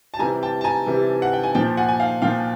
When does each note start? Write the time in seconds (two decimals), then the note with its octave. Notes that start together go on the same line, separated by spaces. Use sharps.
0.14 A5
0.19 C3 E3 G3 G#5 A#5
0.43 G5 A5
0.61 A5
0.64 G#5 A#5
0.86 C3 E3 G3
1.22 F#5
1.33 G5
1.43 G#5
1.55 A#2 F3 G5 A5
1.77 F#5 G#5
1.89 G#5
2.00 F5 G5
2.22 A#2 F3 F5 G5